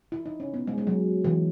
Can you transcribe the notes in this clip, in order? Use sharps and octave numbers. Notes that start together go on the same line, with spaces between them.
E4
D#4
C#4
B3
G#3
G#3
F#3
E3